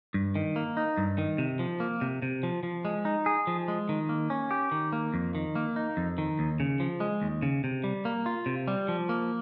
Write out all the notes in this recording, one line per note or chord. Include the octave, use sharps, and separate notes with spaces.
G2
D#3
A#3
D#4
G2
D#3
C3
F3
A#3
C3
C3
F3
F3
G#3
D#4
G#4
F3
G#3
D#3
A#3
C#4
G4
D#3
A#3
F2
D#3
A#3
D#4
F2
D#3
D#2
C#3
F3
G#3
D#2
C#3
C3
G3
A#3
F4
C3
G3
F3
A#3